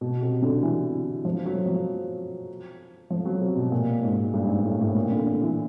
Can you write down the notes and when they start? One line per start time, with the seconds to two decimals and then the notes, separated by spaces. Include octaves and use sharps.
0.01 B2
0.22 C3
0.42 D3
0.63 E3
1.25 F3
1.45 F#3
1.66 F3
3.10 F3
3.25 F#3
3.41 C3
3.56 B2
3.72 A#2
4.03 G#2
4.34 G2
4.49 G#2
4.64 A2
4.80 A2
4.95 A#2
5.11 D3
5.26 D3
5.42 E3